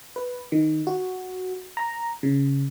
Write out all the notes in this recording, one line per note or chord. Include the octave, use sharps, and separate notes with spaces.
B4
D#3
F#4
A#5
C#3